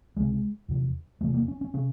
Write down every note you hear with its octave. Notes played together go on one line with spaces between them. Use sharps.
C#2 C3 G#3
E2 C3
E2 C3 A3
A#3
C#4
C#4
C3 C#4